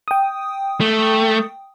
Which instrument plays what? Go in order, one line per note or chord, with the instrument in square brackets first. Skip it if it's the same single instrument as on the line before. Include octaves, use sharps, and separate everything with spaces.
[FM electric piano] G5 D#6
[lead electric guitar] A3